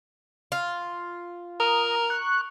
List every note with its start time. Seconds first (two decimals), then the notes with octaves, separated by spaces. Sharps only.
0.52 F4
1.60 A#4 A#5 D#6
2.10 C#6 F#6